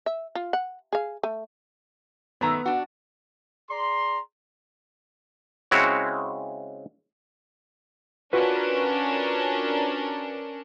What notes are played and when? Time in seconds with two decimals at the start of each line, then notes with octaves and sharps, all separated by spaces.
0.06 E5
0.35 F4
0.53 F#5
0.93 G#4 F5
1.23 A3
2.41 F#2 D#3 A3 B3 A#5
2.66 D4 F#4
3.70 G#4 D5 A#5 C6
5.71 C#3 G#3 C4 E4 F#4 C#5
8.33 C#4 D4 F4 F#4 A#4 B4